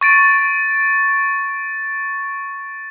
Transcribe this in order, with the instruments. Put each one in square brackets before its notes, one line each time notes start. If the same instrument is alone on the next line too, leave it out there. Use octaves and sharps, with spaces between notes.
[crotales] C#6 A6 D7